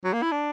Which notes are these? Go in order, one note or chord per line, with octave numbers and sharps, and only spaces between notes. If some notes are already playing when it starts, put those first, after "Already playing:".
F#3
A#3
E4
D4